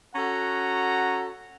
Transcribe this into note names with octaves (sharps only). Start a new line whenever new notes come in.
C#4 F#4 A4 F#5 A#5